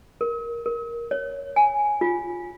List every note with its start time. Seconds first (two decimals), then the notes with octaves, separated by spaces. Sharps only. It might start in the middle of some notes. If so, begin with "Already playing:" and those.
0.21 A#4
0.66 A#4
1.11 C#5
1.56 G#5
2.01 F4